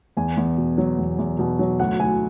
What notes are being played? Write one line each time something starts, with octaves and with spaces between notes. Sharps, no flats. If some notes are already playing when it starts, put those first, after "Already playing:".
E2 G#5
E2
B2
F#3
E2
E2
B2
F#3
D2 F#5
D2 G#5